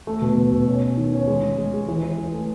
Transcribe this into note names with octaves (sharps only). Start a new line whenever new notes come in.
A3
B2
B2
B2
C#4
C#4
D#3
C#4
G#3
G#3
G#3
G#3
E3
E3
E3
A3